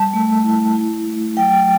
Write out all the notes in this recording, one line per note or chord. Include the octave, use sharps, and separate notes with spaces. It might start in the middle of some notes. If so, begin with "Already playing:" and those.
Already playing: G3 A5
A3
E4
E4
A3
F#3 G5